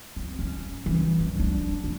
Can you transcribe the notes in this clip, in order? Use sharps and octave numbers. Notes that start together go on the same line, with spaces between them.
C4
C#4
E3
G2
D4
E2